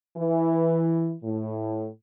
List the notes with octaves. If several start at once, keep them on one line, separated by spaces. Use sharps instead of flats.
E3
A2